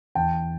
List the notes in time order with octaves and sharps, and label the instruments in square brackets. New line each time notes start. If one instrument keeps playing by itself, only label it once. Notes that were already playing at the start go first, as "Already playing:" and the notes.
[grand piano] E2 G5 A5